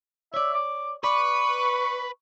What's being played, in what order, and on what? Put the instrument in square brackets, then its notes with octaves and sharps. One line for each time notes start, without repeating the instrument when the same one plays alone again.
[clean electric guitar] C#5 D5 [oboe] E5
[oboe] D6
[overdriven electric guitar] B4 [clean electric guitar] D5 [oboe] C#6